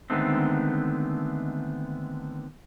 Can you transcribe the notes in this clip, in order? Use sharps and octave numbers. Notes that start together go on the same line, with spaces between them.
D3 D#3 G#3 A3 B3 C4